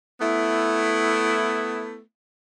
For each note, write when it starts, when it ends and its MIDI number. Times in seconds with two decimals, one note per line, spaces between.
0.21 2.00 57
0.21 2.00 59
0.21 2.00 64